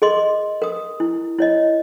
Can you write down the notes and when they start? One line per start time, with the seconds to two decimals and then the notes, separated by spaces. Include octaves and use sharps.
0.02 G#4 A#4 D#5 C6 D6
0.62 A#4 D#6
1.00 E4
1.38 E4 C#5 D#5